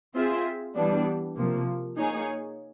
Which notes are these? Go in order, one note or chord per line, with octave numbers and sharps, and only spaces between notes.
C4 F4 G#4 C5 E5
E3 G3 B3 D4
C3 F3 A#3
A#3 D#4 G#4 C#5